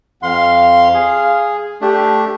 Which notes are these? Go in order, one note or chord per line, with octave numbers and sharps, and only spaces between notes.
F2 F5 C6
G#4
A3 D4 G4